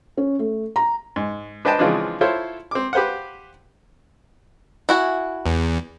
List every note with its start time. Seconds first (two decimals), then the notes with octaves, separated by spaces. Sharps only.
0.17 C#4
0.39 A3
0.76 A#5
1.16 G#2
1.65 D4 B4 C5 D#5 G5 A5
1.79 C#3 E3 F3 G#3 C4 D4
2.21 E4 F4 A4 C5 C#5
2.71 C4 D6
2.93 G4 B4 C5 F5 F#5
4.89 E4 F#4 G#5
5.46 E2